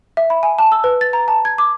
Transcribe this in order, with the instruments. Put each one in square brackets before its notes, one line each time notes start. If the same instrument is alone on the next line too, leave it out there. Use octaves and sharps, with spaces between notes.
[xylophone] E5
B5
G#5
A5
E6
B4
A6
A#5
A5
G#6
D6